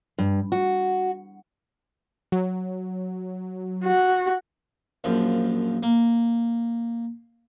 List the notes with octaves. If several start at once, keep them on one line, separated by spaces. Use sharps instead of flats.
G2
F#4
F#3
F#4
A#1 F#2 F3
A#3